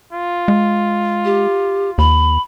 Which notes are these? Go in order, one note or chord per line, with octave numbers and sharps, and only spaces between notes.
F4
G#3
G4
D#2 B5